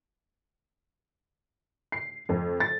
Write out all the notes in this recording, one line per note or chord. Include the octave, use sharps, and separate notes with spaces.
C7
F2
A6